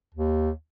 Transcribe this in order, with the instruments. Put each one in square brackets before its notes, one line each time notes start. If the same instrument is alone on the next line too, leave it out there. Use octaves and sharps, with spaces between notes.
[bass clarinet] D#2